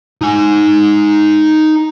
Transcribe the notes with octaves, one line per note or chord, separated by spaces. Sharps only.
D#4 G#5